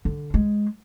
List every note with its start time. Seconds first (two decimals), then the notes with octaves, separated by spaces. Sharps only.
0.05 D3
0.34 G#3